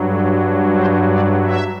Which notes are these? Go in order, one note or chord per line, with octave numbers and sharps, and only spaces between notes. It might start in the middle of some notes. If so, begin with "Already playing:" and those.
Already playing: G2 F#3
A4
C5
D5
E5